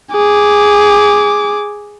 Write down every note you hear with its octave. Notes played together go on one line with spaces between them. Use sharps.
G#4 D6